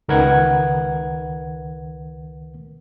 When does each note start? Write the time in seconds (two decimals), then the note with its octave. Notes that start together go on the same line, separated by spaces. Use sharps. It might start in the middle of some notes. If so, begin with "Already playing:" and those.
0.08 C#2 D#3 A#4 B4 F#5 G#6